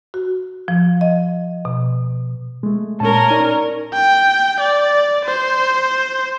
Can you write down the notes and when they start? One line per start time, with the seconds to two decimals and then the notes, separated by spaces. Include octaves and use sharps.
0.14 F#4
0.68 F3
1.01 D#5
1.65 B2
2.63 G#3 A3
3.00 A#2 C#4 A#4 A5
3.30 D#4 D5
3.93 G5
4.60 D5
5.25 C5